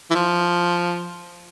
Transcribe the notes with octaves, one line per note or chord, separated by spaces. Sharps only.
E3
F3